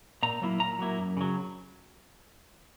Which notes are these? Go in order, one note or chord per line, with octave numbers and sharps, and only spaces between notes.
A#2 A#5
F#3 A#3 E4
A#2 A#5
F#3 A#3 E4
F#2
C#3 F#3